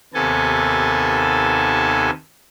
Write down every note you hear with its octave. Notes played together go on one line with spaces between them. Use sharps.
D#2 C3 B3 A4 G#5 A5